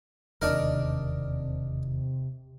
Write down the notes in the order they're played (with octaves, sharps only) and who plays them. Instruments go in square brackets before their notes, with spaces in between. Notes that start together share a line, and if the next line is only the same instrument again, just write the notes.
[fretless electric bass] E1 D#2 [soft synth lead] C3 [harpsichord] D4 D#4 A#4